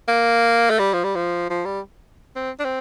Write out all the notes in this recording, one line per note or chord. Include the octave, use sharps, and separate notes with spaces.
A#3
A3
G3
F3
G3
F3
F3
G3
C4
D4
C4